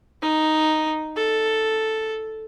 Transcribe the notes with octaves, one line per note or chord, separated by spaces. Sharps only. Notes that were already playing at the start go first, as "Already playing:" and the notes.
D#4
A4